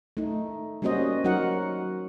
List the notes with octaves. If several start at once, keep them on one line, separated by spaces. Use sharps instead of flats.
A3 D#4
G3 A#3 C#4 F#4 C5 D#5
F#3 D#4 F#4 A#4 F#5